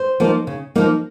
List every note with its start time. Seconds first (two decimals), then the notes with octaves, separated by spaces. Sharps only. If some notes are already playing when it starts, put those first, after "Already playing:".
Already playing: C5
0.20 F3 A#3 D#4
0.47 C#3
0.75 F3 A#3 D#4